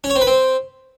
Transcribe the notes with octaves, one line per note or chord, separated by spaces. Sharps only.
C#4
C#5
C4
B4
C4